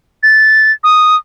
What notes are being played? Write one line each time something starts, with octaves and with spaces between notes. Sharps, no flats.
A6
D#6